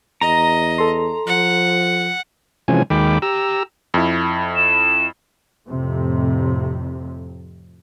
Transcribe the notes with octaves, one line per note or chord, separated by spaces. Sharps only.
E2 D#5 A#5
A4 C6
F3 F#5
C3 E3 F3 G#3 C#4 G#5
D#2 D#3 G#3 G5 B5 D6
G4 A#5 E6
F2 E4
E7
F2 A2 C3